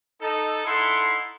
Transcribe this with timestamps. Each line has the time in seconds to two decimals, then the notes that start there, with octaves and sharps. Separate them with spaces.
0.21 D#4 A4
0.65 D#4 E4 A4 E5 F#5 C6